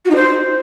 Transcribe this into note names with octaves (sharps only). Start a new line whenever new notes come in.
F#4
D#4
C5